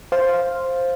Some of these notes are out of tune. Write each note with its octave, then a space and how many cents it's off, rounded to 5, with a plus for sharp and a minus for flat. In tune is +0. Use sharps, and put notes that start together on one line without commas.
C5 +5 F5 +0